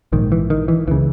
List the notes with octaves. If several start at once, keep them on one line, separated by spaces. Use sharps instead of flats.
A#1 G#2 D#3
E3
D#3
E3
C#2 C#3 E3